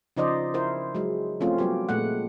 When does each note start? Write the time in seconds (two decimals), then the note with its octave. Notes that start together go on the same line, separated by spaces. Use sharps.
0.17 C#3 F3 D#4 C5 D5 D#5
0.54 E4 A#4 C5
0.95 F#3 G#3
1.40 F3 A3 C4 C#4 F4
1.58 F#3 G3 B3 G4
1.89 A#2 G#3 A3 F#5